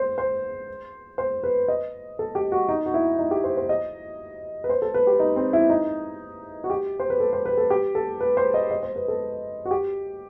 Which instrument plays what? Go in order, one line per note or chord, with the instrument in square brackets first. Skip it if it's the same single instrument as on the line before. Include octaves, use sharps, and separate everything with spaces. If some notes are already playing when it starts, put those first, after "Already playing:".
Already playing: [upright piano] C5
C5
C5
B4
D#5
A4
G4
F#4
D#4
F#4
E4
D#4
G4
C5
C5
D#5
B4
C5
A4
B4
G4
D#4
C4
E4
D#4
F#4
G4
C5
B4
A4
C5
B4
A4
G4
A4
B4
C5
D#5
D#5
C5
B4
A4
F#4
G4